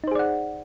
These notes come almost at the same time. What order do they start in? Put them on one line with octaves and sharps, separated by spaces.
D#4 C5 G#4 D5 F#5